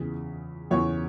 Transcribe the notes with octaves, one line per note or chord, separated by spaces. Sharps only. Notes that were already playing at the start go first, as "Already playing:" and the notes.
Already playing: E2 C#3 E3
E2 C#3 E3 C#5